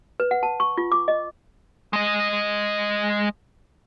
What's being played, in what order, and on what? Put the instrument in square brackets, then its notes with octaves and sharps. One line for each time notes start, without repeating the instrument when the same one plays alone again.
[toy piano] B4
F#5
A5
C#6
F4
D6
D#5
[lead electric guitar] G#3 D#5